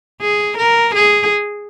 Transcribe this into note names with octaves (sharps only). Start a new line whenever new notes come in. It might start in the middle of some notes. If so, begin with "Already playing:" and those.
G#4
A#4
G#4